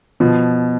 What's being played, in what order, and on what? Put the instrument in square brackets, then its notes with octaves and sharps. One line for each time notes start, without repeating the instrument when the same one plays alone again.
[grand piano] B2 F3